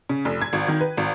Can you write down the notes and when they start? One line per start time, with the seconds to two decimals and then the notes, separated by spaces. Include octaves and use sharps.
0.09 C#3
0.25 F1
0.42 G#6
0.53 G#1
0.68 D#3
0.81 B4
0.97 G#1